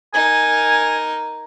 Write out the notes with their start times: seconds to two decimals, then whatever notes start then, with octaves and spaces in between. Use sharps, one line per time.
0.14 D#4 A#4 G#5